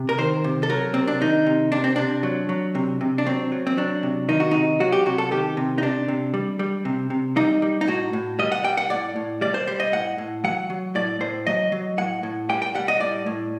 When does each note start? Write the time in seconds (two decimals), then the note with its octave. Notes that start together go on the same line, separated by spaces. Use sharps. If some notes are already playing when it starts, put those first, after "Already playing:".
Already playing: C3
0.09 A#4
0.18 D#3 C5
0.44 C3
0.63 A4
0.70 F#3 A#4
0.94 C3 C4
1.07 D4
1.21 D#3 D#4
1.46 C3
1.72 C3 D4
1.84 C4
1.96 C3 D4
2.23 F#3
2.49 F#3
2.75 C3
3.01 C3
3.18 D4
3.26 F#3 C4
3.52 F#3
3.67 C4
3.77 F#3 D4
4.03 C3
4.29 D#3 D#4
4.40 F#4
4.51 C3 D#4
4.80 F#3 F#4
4.92 G4
5.06 C3 F#4
5.18 A4
5.31 D#3 G4
5.57 C3
5.78 D#4
5.82 C3 D4
6.08 C3
6.34 G3
6.59 G3
6.85 C3
7.10 C3
7.36 G3 D#4
7.62 G3
7.81 D#4
7.88 A2 F#4
8.13 A2
8.39 G3 D#5
8.52 F#5
8.64 G3 G5
8.77 F#5
8.90 A2 D5
9.16 A2
9.41 G3 D5
9.54 C5
9.67 G3 C5
9.80 D#5
9.92 A2 F#5
10.18 A2
10.44 F#3 F#5
10.70 F#3
10.95 A2 D5
11.21 A2 C5
11.47 F#3 D#5
11.72 F#3
11.98 A2 F#5
12.23 A2
12.49 G3 G5
12.62 G5
12.75 G3 F#5
12.88 D#5
13.00 A2 D5
13.26 A2